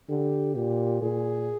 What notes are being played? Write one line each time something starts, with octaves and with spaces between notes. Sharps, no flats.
D3 G4
A#2 G4
A#2 G#4